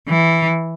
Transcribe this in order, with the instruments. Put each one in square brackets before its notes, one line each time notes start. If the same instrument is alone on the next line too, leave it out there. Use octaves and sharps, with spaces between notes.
[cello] E3